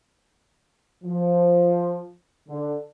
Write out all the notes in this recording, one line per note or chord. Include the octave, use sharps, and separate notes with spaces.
F3
D3